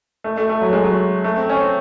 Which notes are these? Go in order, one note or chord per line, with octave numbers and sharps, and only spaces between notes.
A3
A3
A3
F#3
G#3
F#3
A3
C4
C#4
C4